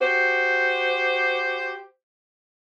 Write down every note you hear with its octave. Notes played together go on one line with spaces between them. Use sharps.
F#4 G4 C5